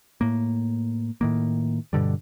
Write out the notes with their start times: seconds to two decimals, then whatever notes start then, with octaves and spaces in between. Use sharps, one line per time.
0.21 A2 A#3
1.21 A2 D#3 A#3
1.93 G2 B2 D3 G3